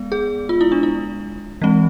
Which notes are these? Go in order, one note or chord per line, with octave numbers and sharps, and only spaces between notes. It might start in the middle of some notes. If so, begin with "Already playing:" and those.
Already playing: G#3 B3
G#4
F4
E4
D4
E4
E3 G#3 C4